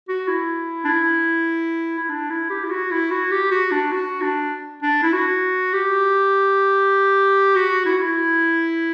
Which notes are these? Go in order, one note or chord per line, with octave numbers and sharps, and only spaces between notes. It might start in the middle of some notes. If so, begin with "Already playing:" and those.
F#4
E4
D4
E4
E4
D4
E4
G4
E4
F#4
E4
F#4
G4
F#4
D4
F#4
D4
D4
E4
F#4
G4
F#4
E4
F#4
E4